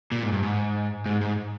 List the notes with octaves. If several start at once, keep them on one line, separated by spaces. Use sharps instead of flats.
A#2
G#2
G2
G#2
G#2
G#2